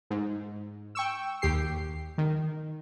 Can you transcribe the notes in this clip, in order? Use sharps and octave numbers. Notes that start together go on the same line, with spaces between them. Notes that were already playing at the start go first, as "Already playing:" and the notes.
G#2
G5 C#6 E6
D#2 G4 C7
D#3